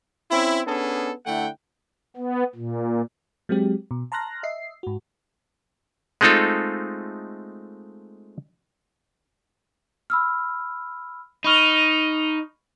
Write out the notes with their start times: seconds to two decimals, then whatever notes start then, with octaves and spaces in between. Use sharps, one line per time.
0.31 C4 C#4 E4
0.67 B3 C#4 D4 G#4 A4
1.26 D3 A3 E4 F#5 G5
2.17 B3
2.55 A#2
3.49 F#3 G#3 C4 G4
3.91 B2
4.12 A5 A#5 C6 F6 F#6 A#6
4.43 D#5 E5 C7
4.83 G#2 F#4
6.21 G#3 A3 C4 D#4 F4 A4
10.10 B5 E6 F6
11.44 D#4 B5 C#6 F6